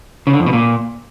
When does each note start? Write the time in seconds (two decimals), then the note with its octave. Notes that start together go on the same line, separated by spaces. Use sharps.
0.27 C#3
0.33 D3
0.40 F2
0.46 B2
0.53 A#2